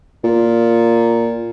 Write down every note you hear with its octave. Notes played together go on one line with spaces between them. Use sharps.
A#2